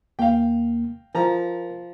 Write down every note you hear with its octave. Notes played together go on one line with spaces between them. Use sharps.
D#2 A#3 F5 G5
F3 A#4 A#5